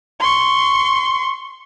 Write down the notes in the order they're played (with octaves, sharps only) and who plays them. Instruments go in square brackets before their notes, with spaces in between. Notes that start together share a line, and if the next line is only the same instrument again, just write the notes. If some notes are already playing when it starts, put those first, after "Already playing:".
[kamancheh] C6 C#6